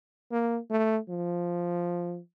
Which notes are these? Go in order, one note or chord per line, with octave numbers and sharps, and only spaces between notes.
A#3
A3
F3